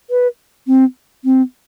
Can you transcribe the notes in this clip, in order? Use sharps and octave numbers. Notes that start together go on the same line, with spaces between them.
B4
C4
C4